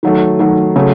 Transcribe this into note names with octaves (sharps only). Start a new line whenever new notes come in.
D#3 F#3 A3
D#3 F#3 A3
C#3 F#3 A3